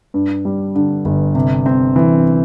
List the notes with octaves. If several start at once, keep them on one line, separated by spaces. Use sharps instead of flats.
G2
G3
D3
G1
C3
C4
E3